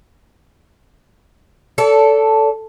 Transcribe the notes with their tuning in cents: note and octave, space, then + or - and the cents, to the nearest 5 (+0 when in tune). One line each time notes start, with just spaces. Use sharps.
A4 +0 D5 -45